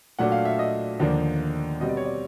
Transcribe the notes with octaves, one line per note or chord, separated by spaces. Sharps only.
A#2 F#3 A3 D4 F#5
F5
E5
D#5
D#2 D3 F3 A#3 D4
B2 G3 C4 D#5
D5
C#5
D5